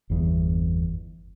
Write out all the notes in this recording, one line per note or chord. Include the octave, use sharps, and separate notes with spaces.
G1 E2